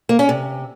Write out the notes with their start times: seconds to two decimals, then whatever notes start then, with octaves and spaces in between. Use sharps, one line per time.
0.09 A#3
0.19 C#4
0.29 C3